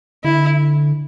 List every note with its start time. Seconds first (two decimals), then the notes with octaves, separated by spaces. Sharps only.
0.24 D3 E4